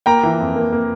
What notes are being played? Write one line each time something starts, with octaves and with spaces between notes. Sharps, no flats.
A#3 G5 A#5
E3
F2
A#3
A#3